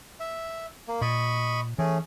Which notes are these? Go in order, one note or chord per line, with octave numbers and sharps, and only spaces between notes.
E5
A#3
A#2 D#5 B5 C#6
E3 A3 C#4 G#4